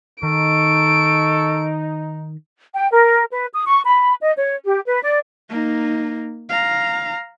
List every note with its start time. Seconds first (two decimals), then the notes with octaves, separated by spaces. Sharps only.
0.23 D#3 D#4 A4 C#6 D7
2.73 G5
2.92 A#4
3.32 B4
3.53 D#6
3.66 C#6
3.86 B5
4.22 D#5
4.38 C#5
4.65 G4
4.86 B4
5.03 D5
5.50 A#3 D#4
6.49 F5 A#5